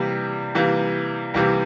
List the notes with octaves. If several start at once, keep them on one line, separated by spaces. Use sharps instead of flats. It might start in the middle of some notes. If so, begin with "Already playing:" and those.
Already playing: C3 E3 G3 A#3
C3 E3 G3 A#3
C3 E3 G3 A#3